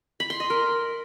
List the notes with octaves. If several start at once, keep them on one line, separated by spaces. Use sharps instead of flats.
B5
C6
D#5
A#4